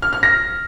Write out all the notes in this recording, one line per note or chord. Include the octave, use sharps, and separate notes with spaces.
F6
F6
A#6